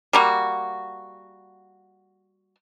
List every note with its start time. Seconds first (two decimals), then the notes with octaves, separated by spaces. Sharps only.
0.13 G3 A#3 F#4